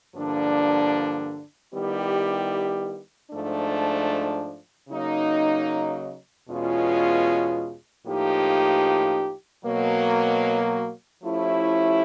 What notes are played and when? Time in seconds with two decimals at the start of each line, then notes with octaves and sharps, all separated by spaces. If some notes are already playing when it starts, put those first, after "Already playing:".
0.14 G2 D3 F3 A#3 D4
1.72 D#3 G3 B3 E4 G4
3.31 G#2 F3 A3 D4
4.89 C#3 F#3 A#3 D#4
6.48 E2 B2 G#3 C#4 F4
8.05 A2 F3 A#3 D#4 G4
9.64 B2 F#3 A#3
11.22 F3 A3 C#4 E4 G4